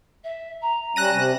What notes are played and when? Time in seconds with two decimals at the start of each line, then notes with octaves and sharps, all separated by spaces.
0.24 E5
0.61 A#5
0.96 G3 C#4 A5 F#6 A#6 D#7
1.11 C3